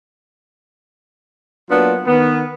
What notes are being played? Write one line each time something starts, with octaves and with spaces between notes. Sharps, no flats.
F#3 A#3 B3 D4 F4
D#3 B3